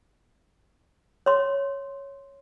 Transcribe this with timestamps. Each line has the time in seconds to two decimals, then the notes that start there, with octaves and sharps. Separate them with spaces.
1.26 C#5 C6